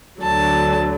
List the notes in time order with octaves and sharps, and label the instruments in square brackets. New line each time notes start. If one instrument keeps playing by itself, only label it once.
[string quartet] D2 D3 F#3 A5